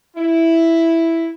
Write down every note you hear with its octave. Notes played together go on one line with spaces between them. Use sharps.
E4